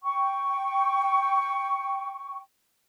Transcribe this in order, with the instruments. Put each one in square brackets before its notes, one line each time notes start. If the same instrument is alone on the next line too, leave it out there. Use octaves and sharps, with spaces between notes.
[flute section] G5 C#6